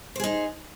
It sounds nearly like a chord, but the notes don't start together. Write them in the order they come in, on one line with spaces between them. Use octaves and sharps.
C5 G#4 D#4